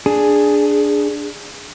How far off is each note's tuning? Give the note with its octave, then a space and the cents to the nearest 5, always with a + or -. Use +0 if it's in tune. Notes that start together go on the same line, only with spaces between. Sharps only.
D4 +0 G#4 +0